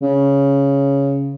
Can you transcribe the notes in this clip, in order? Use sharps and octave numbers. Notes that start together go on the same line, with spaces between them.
C#3